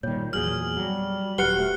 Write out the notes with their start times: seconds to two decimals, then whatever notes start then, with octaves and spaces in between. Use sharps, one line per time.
0.03 A#2 D#3 G3 C#5
0.33 E2 A#2 F#3 G#4 F6 F#7
0.77 F#3 G3
1.38 D#1 F#3 G4 B4 F#5 F#6 C#7 G7
1.58 A3